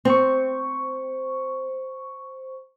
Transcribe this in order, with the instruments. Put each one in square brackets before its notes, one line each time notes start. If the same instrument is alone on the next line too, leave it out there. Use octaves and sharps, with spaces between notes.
[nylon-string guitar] C4 [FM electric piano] C5 C#6